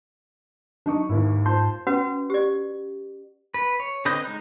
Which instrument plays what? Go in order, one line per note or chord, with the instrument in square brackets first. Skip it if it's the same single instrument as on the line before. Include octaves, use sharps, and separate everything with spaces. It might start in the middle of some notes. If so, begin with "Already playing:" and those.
[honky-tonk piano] F#3 D#4 C#6 [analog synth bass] D4
[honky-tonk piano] D#2 A#3 E4 [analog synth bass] G#2
[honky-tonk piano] F4 C5 [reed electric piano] A5 C6 G6
[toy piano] C#4 F#4 B4 F#5
G4 D5
[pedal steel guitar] B4
C#5
D3 C4 B4 D#5 G6
G#3 D#4